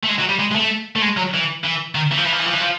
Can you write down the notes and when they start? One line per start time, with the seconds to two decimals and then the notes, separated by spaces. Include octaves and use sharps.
0.04 A3
0.09 G#3
0.19 F#3
0.29 G3
0.39 G#3
0.51 G#3
0.55 A3
0.96 A3
1.02 G#3
1.17 F#3
1.34 E3
1.64 E3
1.95 D#3
2.12 E3
2.18 F3
2.26 E3
2.33 F3
2.40 E3
2.46 F3
2.53 E3
2.61 F3